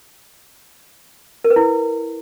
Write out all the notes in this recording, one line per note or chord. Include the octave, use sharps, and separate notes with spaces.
A#4
B4
E4